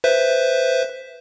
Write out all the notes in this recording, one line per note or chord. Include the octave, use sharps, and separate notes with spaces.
B4 C5 E5